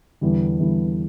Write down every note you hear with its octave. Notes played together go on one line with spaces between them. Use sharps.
E2 D3 G3 B3 E4
E2 D3 G3 B3 E4